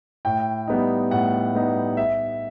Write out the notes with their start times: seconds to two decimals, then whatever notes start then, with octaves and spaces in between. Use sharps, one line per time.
0.25 A2 G5
0.67 G3 B3 D#4
1.11 A2 F#5
1.54 G3 B3 D#4
1.97 E5